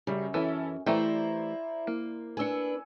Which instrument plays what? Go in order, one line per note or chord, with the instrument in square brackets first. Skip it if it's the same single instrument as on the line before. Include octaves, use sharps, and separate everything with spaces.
[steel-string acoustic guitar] F#2 [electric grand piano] C#3 G3
[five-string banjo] E3 E4 [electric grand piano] C#4 A4
[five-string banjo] E3 A3 G4 [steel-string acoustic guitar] E4 [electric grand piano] C5 D5 A#5
[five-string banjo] A#3
[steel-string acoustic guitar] D4 B4 [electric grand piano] G#5 E6 C#7